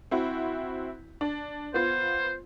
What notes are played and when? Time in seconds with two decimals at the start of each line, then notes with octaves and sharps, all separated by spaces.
0.11 C4 E4 F#4
1.21 D4
1.74 B3 F4 C5